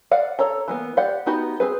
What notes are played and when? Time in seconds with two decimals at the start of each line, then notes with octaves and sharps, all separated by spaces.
0.11 D5 F5 F#5
0.39 A4 C#5 A#5
0.68 E3 A#3 B3
0.97 G4 D5 F5 F#5
1.26 B3 D#4 F#4 G4 B5
1.60 C4 G#4 B4